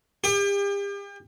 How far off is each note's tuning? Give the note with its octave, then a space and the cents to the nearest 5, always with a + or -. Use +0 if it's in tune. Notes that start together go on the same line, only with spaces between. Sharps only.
G4 +40